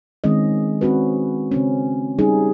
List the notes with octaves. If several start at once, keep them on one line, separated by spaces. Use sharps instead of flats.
D#3 G#3 C4 C#4 D#5
C4 C#4 F#4 B4
C#3 C4 C#4
G3 C#4 D#4 G#4